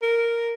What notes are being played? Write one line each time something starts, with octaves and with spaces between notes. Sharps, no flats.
A#4